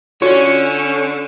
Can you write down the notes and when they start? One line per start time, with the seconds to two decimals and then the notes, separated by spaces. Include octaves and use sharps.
0.22 D3 C#4 F4 F#4 C#5 D5